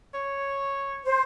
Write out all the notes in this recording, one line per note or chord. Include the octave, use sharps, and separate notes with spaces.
C#5
C5